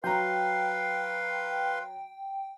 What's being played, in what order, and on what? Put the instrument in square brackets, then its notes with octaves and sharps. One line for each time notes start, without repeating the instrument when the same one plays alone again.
[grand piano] F#3 A#5 [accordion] B4 F5 C6 [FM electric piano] G5